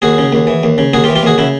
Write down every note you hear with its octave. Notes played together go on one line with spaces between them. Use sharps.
D#2 F#4 G#4
C#3
D#2
E3
D#2
C#3
D#2 F#4 G#4
F4 G4
E3
F4 G4
D#2 F#4 G#4
C#3 E4 F#4